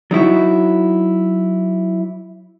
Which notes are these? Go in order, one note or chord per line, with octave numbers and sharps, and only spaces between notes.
F#3 D#4 E4 F#4